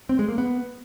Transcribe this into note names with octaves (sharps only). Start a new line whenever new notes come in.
C4
G#3
A#3
B3